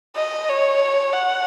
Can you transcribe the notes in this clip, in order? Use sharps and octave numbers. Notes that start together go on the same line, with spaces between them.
D#5
C#5
F#5